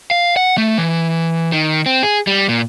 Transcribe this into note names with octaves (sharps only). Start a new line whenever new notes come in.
F5
F#5
A3
E3
D#3
C4
G#4
G3
A#2